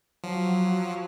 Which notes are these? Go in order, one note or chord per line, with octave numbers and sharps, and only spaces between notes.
F3 F#3